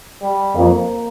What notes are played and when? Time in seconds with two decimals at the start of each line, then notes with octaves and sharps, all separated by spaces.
0.22 G3
0.55 F2 A#3